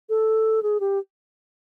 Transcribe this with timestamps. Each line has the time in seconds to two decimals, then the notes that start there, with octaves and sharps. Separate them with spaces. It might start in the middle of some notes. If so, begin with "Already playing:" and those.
0.09 A4
0.63 G#4
0.80 G4